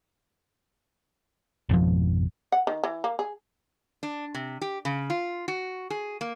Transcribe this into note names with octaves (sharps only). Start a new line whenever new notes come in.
G#1 F2 B2 F3
F#5
D#3
E3
A#3
G#4
D4
C3
G4
C#3
F4
F#4
G#4
A#3